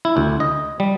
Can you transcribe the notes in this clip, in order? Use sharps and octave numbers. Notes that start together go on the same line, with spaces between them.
E4
D2
D#5
G3